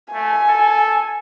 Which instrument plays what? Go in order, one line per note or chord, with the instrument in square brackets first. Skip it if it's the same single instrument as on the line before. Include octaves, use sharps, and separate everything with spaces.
[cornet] A3 [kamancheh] G#5
[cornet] A4